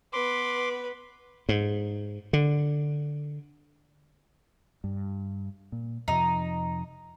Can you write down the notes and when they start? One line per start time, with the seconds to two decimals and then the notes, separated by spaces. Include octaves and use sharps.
0.13 B3 B4 C6 D6
1.49 G#2
2.33 D3
4.84 G2
5.72 A#2
6.08 F2 C3 F3 D#4